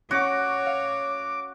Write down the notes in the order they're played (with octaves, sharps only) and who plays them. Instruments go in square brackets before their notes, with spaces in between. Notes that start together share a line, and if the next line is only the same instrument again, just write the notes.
[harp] C#4 F#5 [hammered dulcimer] F#4 [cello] C#5 [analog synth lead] D6
[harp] F5